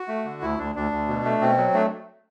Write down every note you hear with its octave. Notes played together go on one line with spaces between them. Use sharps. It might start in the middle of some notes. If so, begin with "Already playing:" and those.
Already playing: F#4
A3
D3
D2 E4
D2 D4
D2 D4
D2
B2
A3
B2 C4
F#3
A3 D4